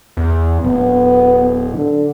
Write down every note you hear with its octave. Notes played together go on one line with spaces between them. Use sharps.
E2
D1 B3
D3